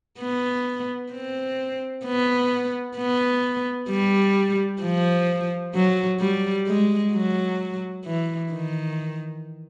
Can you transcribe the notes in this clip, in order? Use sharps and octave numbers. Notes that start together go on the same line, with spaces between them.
B3
C4
B3
B3
G3
F3
F#3
G3
G#3
F#3
E3
D#3